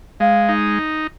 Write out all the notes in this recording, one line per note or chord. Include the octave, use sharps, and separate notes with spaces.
G#3 F5
D#4